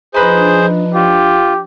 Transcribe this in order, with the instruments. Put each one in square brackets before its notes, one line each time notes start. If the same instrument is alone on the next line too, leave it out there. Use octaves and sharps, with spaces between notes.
[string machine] F3 D4 [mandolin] D#4 B4 D#5 [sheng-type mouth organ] G#4 C5
[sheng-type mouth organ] F4 [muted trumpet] G4